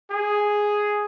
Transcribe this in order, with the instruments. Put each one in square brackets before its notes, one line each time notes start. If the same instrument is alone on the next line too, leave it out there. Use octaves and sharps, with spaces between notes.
[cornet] G#4